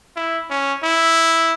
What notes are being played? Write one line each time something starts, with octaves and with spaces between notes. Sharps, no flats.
E4
C#4
E4